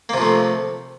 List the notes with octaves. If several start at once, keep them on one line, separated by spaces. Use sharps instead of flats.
C3 F3 A3 A#3